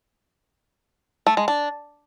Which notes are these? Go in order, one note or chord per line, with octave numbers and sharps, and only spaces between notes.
A3
G#3
D4